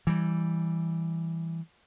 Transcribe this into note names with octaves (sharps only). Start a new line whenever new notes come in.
E3 G3